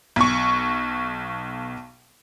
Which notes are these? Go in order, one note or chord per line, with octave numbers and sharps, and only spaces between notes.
B1 C#6